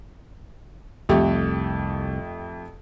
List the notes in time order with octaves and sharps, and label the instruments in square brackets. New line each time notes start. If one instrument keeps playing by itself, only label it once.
[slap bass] C2 [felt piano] F2 A3 G4